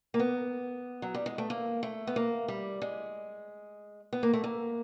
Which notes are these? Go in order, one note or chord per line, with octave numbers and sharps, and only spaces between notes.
A#3
B3
F#3
G3
G#3
A3
A#3
A3
B3
A#3
G3
G#3
B3
A#3
A3
A#3